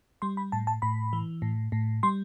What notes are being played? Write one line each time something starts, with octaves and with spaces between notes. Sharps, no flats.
G3 C6
B5
A2 A5
A5
A2 B5
E3
A2
A2
G3 C6